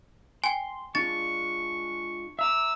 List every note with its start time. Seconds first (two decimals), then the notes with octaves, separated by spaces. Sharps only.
0.44 G5 G#5 C6
0.95 G#3 D4 F4 C#6 A6
2.39 E5 A#5 D6 E6